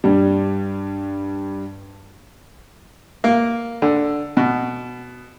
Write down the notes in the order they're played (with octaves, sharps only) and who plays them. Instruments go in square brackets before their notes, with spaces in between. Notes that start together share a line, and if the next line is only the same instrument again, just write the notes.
[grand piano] G2 G3
[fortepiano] A#3
D3
B2